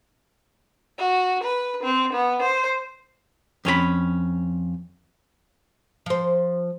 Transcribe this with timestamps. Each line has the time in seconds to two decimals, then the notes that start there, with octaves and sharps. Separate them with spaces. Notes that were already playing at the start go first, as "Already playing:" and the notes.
0.98 F#4
1.43 B4
1.83 C4
2.13 B3
2.42 C5
3.65 F2 C#4 G#4 B5
6.06 F3 C5